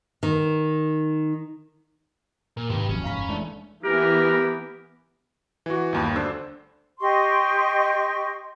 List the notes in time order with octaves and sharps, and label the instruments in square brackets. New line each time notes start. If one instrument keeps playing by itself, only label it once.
[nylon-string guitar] D#3
[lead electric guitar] A#2 [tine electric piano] A#4
[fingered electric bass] G#2 [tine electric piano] C3 [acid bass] D#3 [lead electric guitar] G4 B4
[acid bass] F#1 [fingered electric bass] D2 F3 F#3 [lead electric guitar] C#4
[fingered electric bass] F1 G#2 [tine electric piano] F5 A#5 B5
[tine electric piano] E3 D4 [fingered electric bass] G#3 [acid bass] A3
[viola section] E3 B3 [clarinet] G4 [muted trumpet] A#4
[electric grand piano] E3 F#4
G1 D#2 B5
D2 D4 A4 C5 E6
[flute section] G4 D#5 C6 C#6